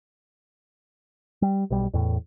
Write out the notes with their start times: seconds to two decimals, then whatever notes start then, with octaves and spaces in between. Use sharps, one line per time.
1.42 G3
1.70 B1 G3
1.94 E2 A2